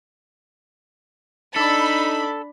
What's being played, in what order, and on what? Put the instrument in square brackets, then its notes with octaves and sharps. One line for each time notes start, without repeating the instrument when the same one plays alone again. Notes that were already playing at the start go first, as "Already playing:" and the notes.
[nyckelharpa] D4 D5 [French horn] D#4 [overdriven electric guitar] A4 [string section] B5